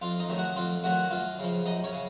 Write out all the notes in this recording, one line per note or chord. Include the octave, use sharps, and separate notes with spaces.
F2 F4 F5
D#4 D#5
D#3 F#3 A3
F#4 F#5
F2 F4 F5
D#3 F#3 A3 F#4 F#5
F#2 F4 F5
C#3 F3
F#2 D#4 D#5
C#4 C#5
C#3